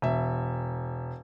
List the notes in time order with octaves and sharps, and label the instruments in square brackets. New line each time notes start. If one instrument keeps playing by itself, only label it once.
[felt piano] E1 E5